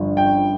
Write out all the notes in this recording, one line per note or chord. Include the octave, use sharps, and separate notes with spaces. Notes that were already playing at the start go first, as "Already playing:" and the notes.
Already playing: G1 G2 F3
G5